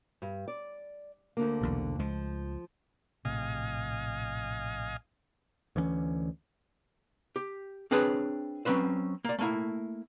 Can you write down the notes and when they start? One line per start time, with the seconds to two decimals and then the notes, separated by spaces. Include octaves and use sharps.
0.22 G2
0.48 D5
1.37 D2 D3 A#3
1.61 B1 E2 C3
1.99 C#2 F3 G#3
3.25 A#1 A2 C3 D#5 F5 G#5
5.76 D2 E3 A3 C#4
7.36 G4
7.91 C4 D4 G#4 B4 C#5
8.65 F#3 C4 C#4 B4 C5
9.25 A#3 D5
9.39 A3 A#3 E4